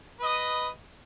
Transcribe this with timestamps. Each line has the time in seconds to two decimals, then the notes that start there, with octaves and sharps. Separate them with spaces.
0.20 B4
0.23 D#5
0.27 D#6